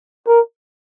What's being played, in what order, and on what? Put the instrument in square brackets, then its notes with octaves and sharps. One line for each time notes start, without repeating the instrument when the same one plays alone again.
[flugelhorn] A#4